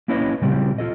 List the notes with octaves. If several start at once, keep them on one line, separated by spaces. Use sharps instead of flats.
A#3 C#4 E4 B4 C#5 D#5
A#2 C#3 G3 C4 E4 G4
F4 A4 D#5